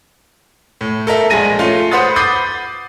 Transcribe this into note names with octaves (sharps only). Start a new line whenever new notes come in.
A2
A4 A#4 E5
A#1 G#3 G#5 A#6 D#7
A3 C#4 F4
B4 C5 F#5 B5 D#6 A6
B5 D6 D#6 G6 A6 C7